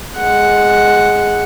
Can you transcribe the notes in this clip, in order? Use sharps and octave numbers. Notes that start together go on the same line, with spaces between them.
G#3 F#5